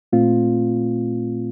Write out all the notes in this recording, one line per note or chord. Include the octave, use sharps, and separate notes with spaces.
A#2 A3 C4 F4